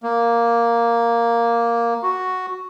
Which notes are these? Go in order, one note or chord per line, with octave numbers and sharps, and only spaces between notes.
A#3
F#4